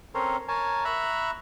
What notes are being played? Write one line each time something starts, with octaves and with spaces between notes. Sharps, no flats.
C4 C#4 A4 A#4 C5 C#5
A#4 C#5 G#5 A5
E5 A#5 B5 C#6 E6 F#6